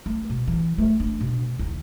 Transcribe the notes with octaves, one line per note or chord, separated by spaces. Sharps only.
A3
B2
E3
A3
D4
B2
D#2